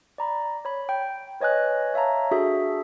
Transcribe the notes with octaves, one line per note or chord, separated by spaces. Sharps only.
D5 A#5 B5
C#5 B5
G5
B4 C#5 D#5 G#5 F#6
C#5 E5 F5 A5 A#5
D4 F#4 G#4 A4 E5